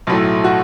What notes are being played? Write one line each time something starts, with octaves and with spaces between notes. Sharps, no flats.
B1 A2 F#3 A3
F#4